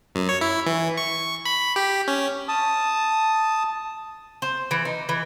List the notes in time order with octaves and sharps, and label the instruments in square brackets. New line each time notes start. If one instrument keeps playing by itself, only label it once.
[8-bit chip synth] F#2
C#5
E4
E3
C#6
B5
G4
C#4
[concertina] A5 D#6
[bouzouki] C5
E3
D#4
E3